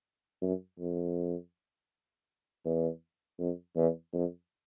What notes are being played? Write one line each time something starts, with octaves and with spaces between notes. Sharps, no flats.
F#2
F2
E2
F2
E2
F2